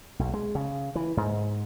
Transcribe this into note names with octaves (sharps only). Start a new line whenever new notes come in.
B1
G#3
C#3
E3
G#2